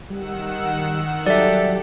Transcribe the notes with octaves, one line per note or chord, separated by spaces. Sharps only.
D#3 G3 F#5 E6
F#3 G3 G4 A4 D5 E5